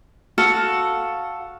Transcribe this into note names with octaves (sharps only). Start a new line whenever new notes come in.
F#4 A4 F5